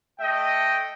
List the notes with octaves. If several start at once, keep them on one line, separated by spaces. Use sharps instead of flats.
A3 D#5 G5